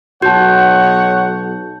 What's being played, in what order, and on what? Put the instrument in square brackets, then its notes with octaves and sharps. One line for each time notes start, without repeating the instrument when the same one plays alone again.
[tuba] B1 [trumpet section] D#4 C#5 F#5 [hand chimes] F#4 [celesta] A5 G6